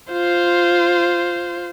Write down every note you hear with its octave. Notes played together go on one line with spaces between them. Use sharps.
F4 C5